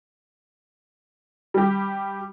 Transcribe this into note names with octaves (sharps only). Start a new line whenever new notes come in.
G3 G4